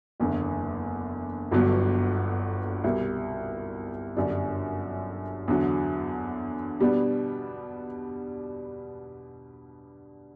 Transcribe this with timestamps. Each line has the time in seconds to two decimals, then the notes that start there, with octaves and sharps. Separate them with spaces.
0.20 F#1 E2 D3
1.51 G1 G2 D3 F#3 B3
2.84 C2 B2 G3
4.17 G1 F#2 D3 G3 D4
5.48 E2 D3 F#3
6.80 B2 G3 B3 D4